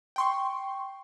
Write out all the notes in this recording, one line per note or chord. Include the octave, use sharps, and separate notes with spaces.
G5 C6 C#6